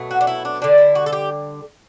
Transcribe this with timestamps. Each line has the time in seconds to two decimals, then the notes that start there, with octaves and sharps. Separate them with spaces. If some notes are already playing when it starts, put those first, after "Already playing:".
Already playing: B2 F#3 A3
0.11 F#4
0.21 D4
0.27 E4
0.45 D4
0.62 D3 G3 D4
0.78 E4
0.95 F#4
1.06 A4
1.13 G4